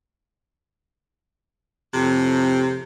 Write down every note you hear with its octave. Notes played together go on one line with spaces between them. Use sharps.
F2 A2 C3